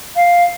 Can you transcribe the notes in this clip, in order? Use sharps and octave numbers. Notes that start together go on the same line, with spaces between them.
F5